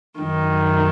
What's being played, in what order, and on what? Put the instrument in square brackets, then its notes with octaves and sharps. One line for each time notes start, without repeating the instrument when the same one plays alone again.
[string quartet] F#2 D#3